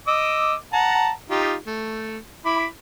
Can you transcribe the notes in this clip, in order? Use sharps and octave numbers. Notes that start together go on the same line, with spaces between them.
D#5 D6 E6
F#5 A5 A#5
D#4 F4 G4
A3
E4 B5 D6